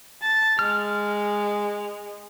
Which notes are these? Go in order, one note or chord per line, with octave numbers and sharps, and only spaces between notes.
A5
G#3 F6